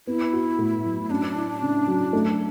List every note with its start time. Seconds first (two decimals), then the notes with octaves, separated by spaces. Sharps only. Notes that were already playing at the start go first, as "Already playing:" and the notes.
0.07 B3 E4
0.33 F#4
0.59 A2
0.84 F#3
1.10 C#4 D4
1.36 E4
1.62 C#3
1.87 F#3
2.13 A3